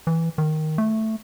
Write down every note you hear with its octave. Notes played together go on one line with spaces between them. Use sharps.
E3
D#3
A3